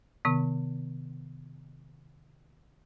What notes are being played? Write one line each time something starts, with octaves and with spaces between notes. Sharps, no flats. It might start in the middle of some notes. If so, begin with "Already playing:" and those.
C3 D#3 B3